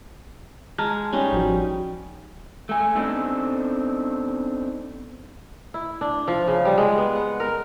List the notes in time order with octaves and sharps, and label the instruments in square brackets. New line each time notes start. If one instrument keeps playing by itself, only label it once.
[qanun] G#3 [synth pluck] A5 A#5 F6
[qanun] G3 C#4 D#4
[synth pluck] A1 F3 F#4
[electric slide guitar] A3 G#5
B3 C4 D4 D#4 A4
[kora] E4
D4
F3
C#3
G3
G#3
B3
F#5
A#4